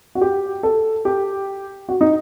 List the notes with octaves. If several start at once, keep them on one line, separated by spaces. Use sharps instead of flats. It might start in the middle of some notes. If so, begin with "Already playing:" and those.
F#4
G4
A4
G4
F#4
D#4